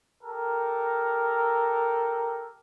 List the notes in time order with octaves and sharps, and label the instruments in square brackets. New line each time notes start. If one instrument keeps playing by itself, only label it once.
[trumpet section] G4 A4 A#4